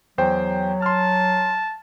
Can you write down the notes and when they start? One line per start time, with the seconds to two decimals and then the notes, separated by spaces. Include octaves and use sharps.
0.18 E2 F#3 C5 G5
0.82 A5 C6 F6